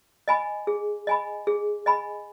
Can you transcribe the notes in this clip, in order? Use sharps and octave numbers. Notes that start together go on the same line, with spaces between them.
D#5 G#5 B5
G#4
D#5 G#5 B5
G#4
D#5 G#5 B5